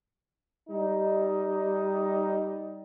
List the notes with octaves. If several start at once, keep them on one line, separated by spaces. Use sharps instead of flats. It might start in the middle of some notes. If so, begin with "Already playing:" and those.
G3 D#4